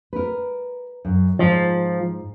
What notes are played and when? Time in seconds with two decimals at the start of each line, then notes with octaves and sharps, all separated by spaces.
0.13 A#4 B4
1.05 F#2
1.39 G#2 F3